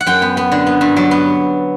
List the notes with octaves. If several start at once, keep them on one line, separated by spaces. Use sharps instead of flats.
F#5
F#2 G5
B3
B3
D3
B3
G2
F#3
B3